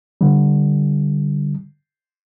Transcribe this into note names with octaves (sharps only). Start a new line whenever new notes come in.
D3 G3